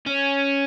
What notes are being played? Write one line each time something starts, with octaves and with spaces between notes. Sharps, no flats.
C#4